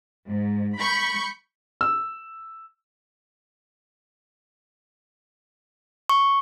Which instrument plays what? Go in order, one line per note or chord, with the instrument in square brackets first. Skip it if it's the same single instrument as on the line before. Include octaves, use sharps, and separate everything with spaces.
[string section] G#2
B5 C#6 G6 C#7
[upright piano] E6
[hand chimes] C#6